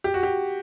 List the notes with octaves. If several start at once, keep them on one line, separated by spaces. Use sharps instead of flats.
G4
F#4
G4